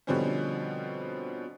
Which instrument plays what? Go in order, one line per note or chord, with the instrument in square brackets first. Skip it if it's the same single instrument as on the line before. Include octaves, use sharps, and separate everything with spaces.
[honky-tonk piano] B2 D3 F3 G3 C4 C#4